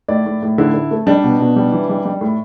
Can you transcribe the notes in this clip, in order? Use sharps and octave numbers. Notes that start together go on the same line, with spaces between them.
A2 D5
A2
A2
D3 E4
D3
A3
G3 D4
B2
B2
G3
E3
G3
G3
A2